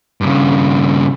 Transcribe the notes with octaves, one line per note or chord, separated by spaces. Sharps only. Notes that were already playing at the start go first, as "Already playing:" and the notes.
G2 C#3